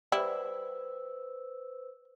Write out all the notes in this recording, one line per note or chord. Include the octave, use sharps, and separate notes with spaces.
G3 E4 B4 C5 E6